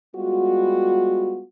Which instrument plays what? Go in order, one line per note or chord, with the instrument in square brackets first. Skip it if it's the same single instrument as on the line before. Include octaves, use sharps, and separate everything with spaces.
[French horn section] G3 G#3 B3 F4 F#4